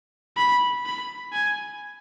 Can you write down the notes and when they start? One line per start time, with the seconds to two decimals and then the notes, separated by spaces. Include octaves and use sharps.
0.37 B5
0.86 B5
1.33 G#5